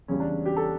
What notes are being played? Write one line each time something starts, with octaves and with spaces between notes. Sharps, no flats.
E2 C#3 G3 C#4
D4
G4
A4